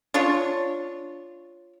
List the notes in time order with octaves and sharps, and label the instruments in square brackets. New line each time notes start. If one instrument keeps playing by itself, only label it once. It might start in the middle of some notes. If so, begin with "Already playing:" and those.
[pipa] D4 F4 C#5